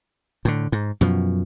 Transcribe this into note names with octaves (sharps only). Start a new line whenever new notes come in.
A2 D3
G#2
F#2 B2 F3